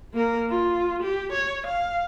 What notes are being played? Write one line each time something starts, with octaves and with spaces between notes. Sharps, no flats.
A#3 A#4
F4
G4
C#5
F5